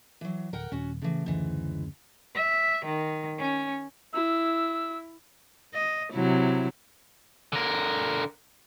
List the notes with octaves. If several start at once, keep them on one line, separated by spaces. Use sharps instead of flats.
E3 F#3
D1 A#4 F#5 G5
D#1 C#4 F#4
A2 C#3 E3
F#1 D2 G#2 C#3 E3
E5
D#3
C#4
E4 E6
D#5
C3 F#3 E4
D3 A#4